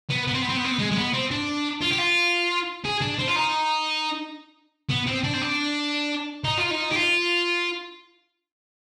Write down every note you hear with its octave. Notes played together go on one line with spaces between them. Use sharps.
B3
B3
C4
B3
C4
B3
C4
B3
G#3
G#3
B3
C4
D4
F4
G4
F4
G#4
D4
C4
F4
D#4
B3
C4
D4
C4
D4
D#4
F4
D#4
G4
F4